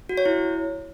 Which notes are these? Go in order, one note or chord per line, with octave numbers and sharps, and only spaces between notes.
F#4
C#5
E4